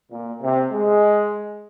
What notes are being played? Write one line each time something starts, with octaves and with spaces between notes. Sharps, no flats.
A#2
C3
G#3